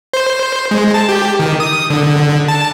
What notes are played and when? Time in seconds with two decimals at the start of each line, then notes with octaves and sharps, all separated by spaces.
0.13 C5
0.71 G#3
0.94 A5
1.09 G4
1.39 D#3
1.60 D#6
1.90 D3
2.48 A5